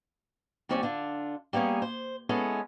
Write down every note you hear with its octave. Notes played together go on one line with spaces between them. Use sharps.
D#2 G3 C4 C#4 C5 D5
D3 D4 F4
G3 A#3 B3 C#4 G#4
C5
G#3 B3 C#4 E4 A4